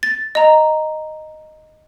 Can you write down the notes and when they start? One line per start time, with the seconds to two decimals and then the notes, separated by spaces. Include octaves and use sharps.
0.03 A6
0.35 D#5 A#5